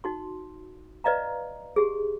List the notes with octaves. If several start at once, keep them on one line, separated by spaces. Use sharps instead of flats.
D#4 F#4 C6
B4 D5 D#5 F5 A#5
G4 G#4